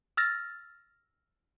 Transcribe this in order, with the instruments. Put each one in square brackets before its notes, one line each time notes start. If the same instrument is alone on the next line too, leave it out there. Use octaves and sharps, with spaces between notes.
[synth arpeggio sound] E6 F6 A6 A#6